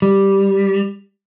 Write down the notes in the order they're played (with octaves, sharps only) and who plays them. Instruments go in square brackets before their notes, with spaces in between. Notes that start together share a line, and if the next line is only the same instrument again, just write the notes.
[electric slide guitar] G3